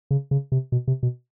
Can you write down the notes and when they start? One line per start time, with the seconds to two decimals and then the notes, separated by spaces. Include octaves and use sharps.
0.11 C#3
0.31 C#3
0.52 C3
0.72 B2
0.88 C3
1.03 B2